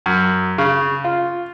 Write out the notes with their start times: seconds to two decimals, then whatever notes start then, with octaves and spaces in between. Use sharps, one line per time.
0.06 F#2
0.58 C#3
1.04 F4